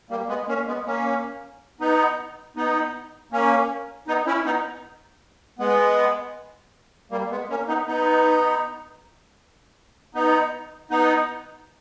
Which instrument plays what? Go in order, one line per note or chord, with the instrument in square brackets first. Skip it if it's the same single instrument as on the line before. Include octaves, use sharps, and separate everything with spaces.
[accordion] G3 A#3
G#3 B3
A#3 C#4
G#3 B3
A#3 C#4
B3 D#4
B3 D#4
A#3 C#4
B3 D#4
C#4 E4
B3 D#4
G#3 B3
G3 A#3
G#3 B3
A#3 C#4
B3 D#4
B3 D#4
B3 D#4
B3 D#4